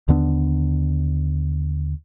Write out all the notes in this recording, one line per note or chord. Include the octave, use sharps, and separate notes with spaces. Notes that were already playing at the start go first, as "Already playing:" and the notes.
D#2 D3 B3 D4